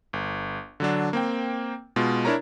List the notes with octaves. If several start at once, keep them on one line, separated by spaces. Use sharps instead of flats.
G1
D3 F#3 D4
A#3 C4 G5
B2 G#3 F4
D4 E4 A#4 C#5 A#5